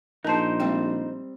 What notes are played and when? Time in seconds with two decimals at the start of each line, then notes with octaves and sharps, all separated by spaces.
0.25 A#1 D#4 A#4 C5 A5
0.60 G3 G#3 C4 G5